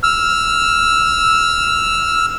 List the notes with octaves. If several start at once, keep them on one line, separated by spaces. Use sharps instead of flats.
E6 F6